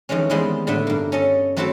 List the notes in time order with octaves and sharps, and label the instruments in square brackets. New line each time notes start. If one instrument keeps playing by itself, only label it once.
[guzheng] F2 D#3 E3 G#3 C#4
D#3 E3 G3 G#3 B3 C4
A2 D3 B3 E5
G2 A#3
C#4 A4 D#5
F#3 A3 C4 E4 F#4 A4